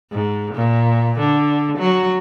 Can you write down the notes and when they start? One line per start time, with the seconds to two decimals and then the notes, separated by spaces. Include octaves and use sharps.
0.12 G#2
0.54 A#2
1.18 D3
1.78 F#3